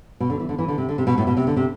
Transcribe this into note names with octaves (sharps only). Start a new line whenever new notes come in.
B2
D3
E3
D3
E3
D3
C3
D3
C3
B2
A2
B2
C3
D3
C3